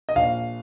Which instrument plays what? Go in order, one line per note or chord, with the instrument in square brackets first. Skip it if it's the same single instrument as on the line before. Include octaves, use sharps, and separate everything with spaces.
[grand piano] D#5
A#1 F5